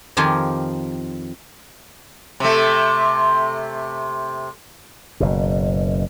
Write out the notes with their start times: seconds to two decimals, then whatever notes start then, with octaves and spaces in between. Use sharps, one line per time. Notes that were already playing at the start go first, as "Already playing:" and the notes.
0.17 F2 D#3 F3 F4 G4 G#5
2.40 C3 A3
5.20 F#1 B2